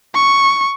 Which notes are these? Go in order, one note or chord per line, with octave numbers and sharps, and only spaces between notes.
C#6